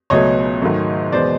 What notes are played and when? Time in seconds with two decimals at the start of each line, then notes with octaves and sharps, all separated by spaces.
0.10 C#2 B2 F#3 A3 C#5 D#5
0.62 G#2 D#3 F#3 A3
1.12 E2 B2 G#3 C5 D5